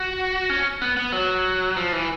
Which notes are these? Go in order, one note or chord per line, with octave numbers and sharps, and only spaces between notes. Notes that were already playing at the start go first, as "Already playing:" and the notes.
Already playing: F#4
C#4
B3
B3
F#3
F3
E3